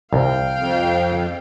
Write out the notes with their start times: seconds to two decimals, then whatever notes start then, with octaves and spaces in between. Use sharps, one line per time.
0.13 C2 F5 G5
0.59 F2